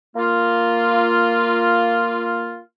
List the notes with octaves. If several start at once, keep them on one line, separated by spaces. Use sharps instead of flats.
A#3 F4